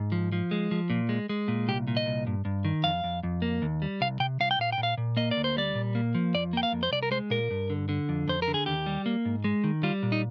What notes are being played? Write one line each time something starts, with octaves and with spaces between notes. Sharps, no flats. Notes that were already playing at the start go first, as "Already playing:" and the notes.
Already playing: G#2
F3
F3
G#3
F3
A#2
G#3
G#3
A#2
C2 G4
A#2
D#5
C2
G2
G2
D#3
F2 F5
F2
F2
A#3
D#2
G3
C2 F5
C3 G5
C2 F5
G5
A#2 F5
G5
A#2
F5
A#2
A#3 D#5
D5
D2
C5
G3 D5
A#2
A#3
F3
F2 D5
A#3 G5
F5
F2
C5
C2 D5
A#4
G#3 C5
A#2 A#4
G2
D3
D3
F2
F2 C5
A#4
D3
G#4
D#2 G4
G3
A#3
G#2
G#3
D#3
G3 F4
A#2
D#4